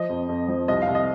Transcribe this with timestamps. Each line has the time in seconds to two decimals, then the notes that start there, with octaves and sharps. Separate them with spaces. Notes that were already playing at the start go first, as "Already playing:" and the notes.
Already playing: F3 D#5
0.09 F2
0.29 F2
0.48 F3
0.68 C2 D#5
0.82 F5
0.87 C2
0.95 D#5